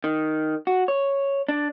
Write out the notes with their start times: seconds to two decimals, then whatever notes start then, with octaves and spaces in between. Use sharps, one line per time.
0.04 D#3
0.67 F#4
0.88 C#5
1.49 D4